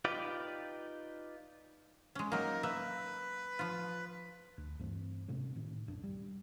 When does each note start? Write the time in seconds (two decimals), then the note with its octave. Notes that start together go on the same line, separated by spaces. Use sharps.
0.05 D#4 F4 G4 B4 D5
2.15 G#3 C#4
2.32 F#3 A#3 D#4 A#4
2.63 A#3 B4 E5
3.59 F3 F4
4.57 D2
4.79 G2 E3 A3 C4
5.28 G#2 C3 A3 C#4
5.55 A2 D#3
5.88 D#1 B1 F#2 D4
6.03 G3